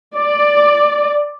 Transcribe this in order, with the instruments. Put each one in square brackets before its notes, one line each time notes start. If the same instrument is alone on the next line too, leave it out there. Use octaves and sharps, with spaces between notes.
[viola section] D5